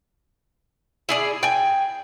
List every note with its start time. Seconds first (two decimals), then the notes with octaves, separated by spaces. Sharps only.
1.09 E4 G#4 D5
1.43 G5 G#5